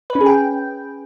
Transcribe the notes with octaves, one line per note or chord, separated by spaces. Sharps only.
B4
C#4
G#4
G5